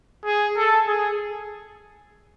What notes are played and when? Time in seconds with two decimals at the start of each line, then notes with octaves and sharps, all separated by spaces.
0.25 G#4
0.57 A4
0.88 G#4